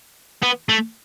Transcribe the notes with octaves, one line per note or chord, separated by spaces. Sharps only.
B3
A3